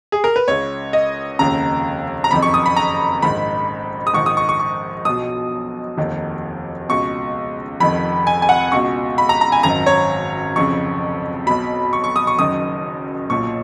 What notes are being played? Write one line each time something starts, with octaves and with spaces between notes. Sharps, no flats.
G#4
A#4
B4
C#2 C#3 C#5
D#5
F1 D#2 C#3 A#5
A#5
F#1 F2 D#3 B5
C#6
D#6
B5
A#5
A#1 G#2 D#3 B5
D#6
A#1 G#2 D#3 C#6
D#6
C#6
C#6
C#6
B1 B2 D#6
F1 D#2 D#3
C#2 B2 C#6
F1 F2 D#3 B5
G#5
G#5
F#5
C#2 B2 C#6
B5
A#5
A#5
G#5
G#1 F#2 D#3 A#5
C#5
F1 F2 C#3 C#6
B1 B2 B5
C#6
C#6
D#6
C#6
F#1 F#2 D#3 D#6
B1 A#2 C#6